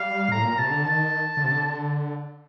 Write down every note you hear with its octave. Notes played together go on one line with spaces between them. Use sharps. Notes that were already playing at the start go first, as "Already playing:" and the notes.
Already playing: G3 F5
A2 A#5
A#2
C3 A5
D3
D#3 A5
D3
C3
D3